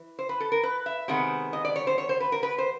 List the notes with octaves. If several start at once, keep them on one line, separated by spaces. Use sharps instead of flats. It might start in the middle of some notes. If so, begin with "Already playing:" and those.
Already playing: E3
C5
B4
A4
A#4
B4
E5
C3 D#3 G#3 B3
D#5
D5
C#5
C5
C#5
C5
B4
A#4
B4
C5